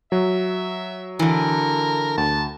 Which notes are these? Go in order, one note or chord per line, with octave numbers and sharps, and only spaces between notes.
F#3 E5
D3 E3 A#4
D2 A5